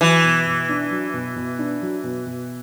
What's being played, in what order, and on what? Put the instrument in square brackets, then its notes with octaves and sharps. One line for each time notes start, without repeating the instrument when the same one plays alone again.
[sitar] E3 [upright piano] F#3
[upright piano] B2
B2
D4
F#3
B2
B2
D4
F#3
B2
B2